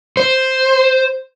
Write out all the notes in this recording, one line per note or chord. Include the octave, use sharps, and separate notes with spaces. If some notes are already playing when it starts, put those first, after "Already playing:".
C5